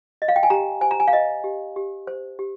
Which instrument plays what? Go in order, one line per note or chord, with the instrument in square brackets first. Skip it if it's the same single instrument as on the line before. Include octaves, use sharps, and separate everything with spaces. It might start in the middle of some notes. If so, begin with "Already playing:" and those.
[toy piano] D#5
F5
G5
G#5
G4 A#5
C5 G#5
A#5
G#5
F5
C5 D#5
G4
G4
C5
G4